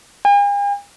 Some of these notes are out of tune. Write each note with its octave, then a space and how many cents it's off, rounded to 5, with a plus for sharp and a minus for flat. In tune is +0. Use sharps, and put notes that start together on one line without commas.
G#5 -45